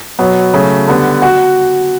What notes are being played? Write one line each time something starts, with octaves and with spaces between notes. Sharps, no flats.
B2 F#3 B3
C#3 F#3 A3
D3 G3 B3
F#4